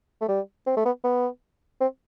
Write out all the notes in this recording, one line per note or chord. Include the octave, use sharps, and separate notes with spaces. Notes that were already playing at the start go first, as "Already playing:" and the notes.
A3
G3
C4
A3
B3
B3
C4